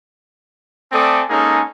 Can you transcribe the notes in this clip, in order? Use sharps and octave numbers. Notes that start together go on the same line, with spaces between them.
A3 C4 A4 D5 G#5 D#6
G#3 A#3 C#4 D#4 G#4 A4